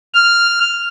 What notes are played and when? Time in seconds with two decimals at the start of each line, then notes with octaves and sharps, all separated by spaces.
0.14 F6